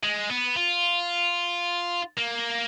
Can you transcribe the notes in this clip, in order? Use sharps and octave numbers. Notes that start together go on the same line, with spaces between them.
G#3
B3
F4
A#3